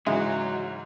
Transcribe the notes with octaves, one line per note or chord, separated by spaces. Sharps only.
G#2 C#3 E3 F#3 G#3 E5